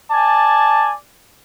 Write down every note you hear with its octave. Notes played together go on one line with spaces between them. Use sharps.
D5 G#5 A5